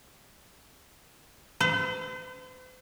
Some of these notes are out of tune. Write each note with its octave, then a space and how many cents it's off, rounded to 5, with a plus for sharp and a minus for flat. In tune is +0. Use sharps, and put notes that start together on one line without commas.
C5 -45